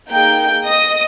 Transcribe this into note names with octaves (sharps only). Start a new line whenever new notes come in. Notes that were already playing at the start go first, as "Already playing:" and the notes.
A#3 D#4 G#4 G5 G6
D#5 D#6